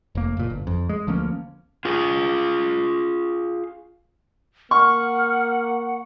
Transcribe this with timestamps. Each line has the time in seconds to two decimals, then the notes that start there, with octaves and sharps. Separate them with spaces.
0.15 F1 A#3
0.37 F#1 A#2
0.50 G1
0.67 F2
0.89 G#3
1.07 D2 F3 A#3 C#4
1.85 F4 G#4
4.71 A#3 F#5 C#6 F6